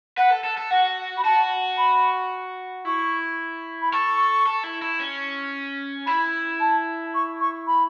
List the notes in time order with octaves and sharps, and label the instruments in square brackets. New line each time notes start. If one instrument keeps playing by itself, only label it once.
[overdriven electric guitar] B4 [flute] F#5
[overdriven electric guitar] A4
A4
A4
[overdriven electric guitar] F#4 [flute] F#5
[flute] B5
[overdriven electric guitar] F#4 [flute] A5
[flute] B5
[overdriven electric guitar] E4 [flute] C#6
[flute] B5
[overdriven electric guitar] A4 [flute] C#6
[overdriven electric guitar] A4
E4
E4
C#4
[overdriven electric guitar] E4 [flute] B5
[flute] A5
C#6
C#6
B5